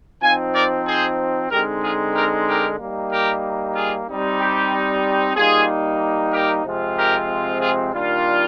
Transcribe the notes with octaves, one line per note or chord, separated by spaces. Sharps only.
F3 C4 D#4 F5 G#5
A#4 D5
G#4 C5
D3 G#3 C4 D#4 G4 A#4
F4 G#4
G4 A#4
G4 A#4
G3 A#3 D#4
G4 A#4
F4 G#4
G3 C4 D#4
G4
G3 A#3 D#4 F4 G#4
G4 A#4
C3 F3 G#3 C4 F4
G4 A#4
F4 G#4
D#3 G3 A#3 D4 F4